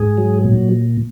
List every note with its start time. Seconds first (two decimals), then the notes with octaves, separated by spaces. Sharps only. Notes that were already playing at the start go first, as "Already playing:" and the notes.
Already playing: G#2 G#4
0.18 F#3
0.44 A#2